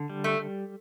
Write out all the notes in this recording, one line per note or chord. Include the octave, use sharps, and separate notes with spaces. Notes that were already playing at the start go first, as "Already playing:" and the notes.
Already playing: D3
G3
A3